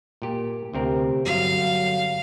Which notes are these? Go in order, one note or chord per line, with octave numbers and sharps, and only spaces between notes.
A#2 G4
D2 C3 C4 A#4
G1 F#3 F5